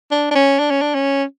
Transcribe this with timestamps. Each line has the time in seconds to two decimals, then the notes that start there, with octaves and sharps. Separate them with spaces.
0.11 D4
0.31 D4
0.36 C#4
0.59 D4
0.70 C#4
0.81 D4
0.95 C#4